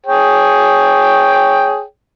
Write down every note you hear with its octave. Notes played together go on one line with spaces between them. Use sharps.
G#4 C#5 G5